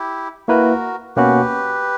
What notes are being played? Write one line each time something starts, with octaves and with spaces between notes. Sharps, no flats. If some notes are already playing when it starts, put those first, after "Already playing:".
Already playing: E4 G4
A#3 E4 F#4 A#4 B4
B2 A#3 C#4 F#4 G4 B4